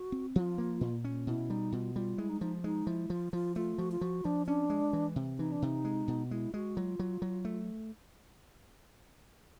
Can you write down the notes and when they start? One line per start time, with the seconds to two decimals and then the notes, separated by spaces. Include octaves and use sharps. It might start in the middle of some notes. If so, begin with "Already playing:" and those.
Already playing: F#4
0.12 C4
0.36 F3 F4
0.58 A#3
0.81 A#2
1.04 C#4
1.27 B2 E4
1.50 G3 D#4
1.72 B2 F4
1.95 G3 F4
2.18 G#3 E4
2.29 D#4
2.41 F3 D#4
2.64 G#3 D#4
2.87 F3 E4
3.09 F3 F4
3.33 F3 F4
3.56 A3 F4
3.78 F3 F#4
3.92 F4
4.01 F3 F#4
4.25 F3 D4
4.47 C#4 D4
4.70 G#3
4.93 E3
5.16 C3
5.38 E3 D#4
5.52 D4
5.62 C3 D#4
5.85 G#3
6.08 B2
6.31 G#3 E4
6.54 G#3 F#4
6.76 F#3 F4
6.99 F#3
7.22 F#3
7.45 A3